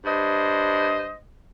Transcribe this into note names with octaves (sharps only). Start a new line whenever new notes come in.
G2 C5 D#5